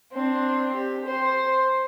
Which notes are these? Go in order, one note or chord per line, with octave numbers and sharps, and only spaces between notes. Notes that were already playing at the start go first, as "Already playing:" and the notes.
C4 D4
G4
C5